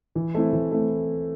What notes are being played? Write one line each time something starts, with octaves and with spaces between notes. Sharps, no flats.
E3
A3 C4 E4
E3
A3 C4 E4